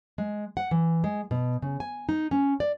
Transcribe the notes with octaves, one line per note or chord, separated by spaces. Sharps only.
G#3
F#5
E3
G#3
B2
C#3
G#5
D#4
C#4
D5